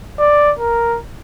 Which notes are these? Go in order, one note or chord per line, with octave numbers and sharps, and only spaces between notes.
D5
A#4